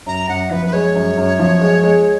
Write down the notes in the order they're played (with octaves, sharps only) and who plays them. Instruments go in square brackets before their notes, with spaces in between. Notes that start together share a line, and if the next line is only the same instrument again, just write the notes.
[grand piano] F#2 [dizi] A#5
[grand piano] F#2 [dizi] F#5
[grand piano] F3 [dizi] B4
[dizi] B4
[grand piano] G#3 [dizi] C#5
[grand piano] F#2
F#2
F3
G#3
G#3